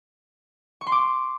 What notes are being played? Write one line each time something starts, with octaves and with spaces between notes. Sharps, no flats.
C#6
C6
D6